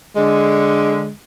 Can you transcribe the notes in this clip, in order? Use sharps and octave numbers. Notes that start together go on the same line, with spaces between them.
D3 G#3